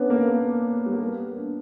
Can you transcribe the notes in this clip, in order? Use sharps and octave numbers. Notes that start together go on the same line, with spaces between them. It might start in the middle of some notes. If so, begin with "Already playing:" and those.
Already playing: B3 C#4 D4
A#3
A#3
G3
A#3
B3
D4